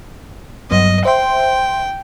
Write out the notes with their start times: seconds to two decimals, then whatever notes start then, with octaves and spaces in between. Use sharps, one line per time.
0.71 G2 F#3 B3 D#5
1.05 C5 E5 G5 C6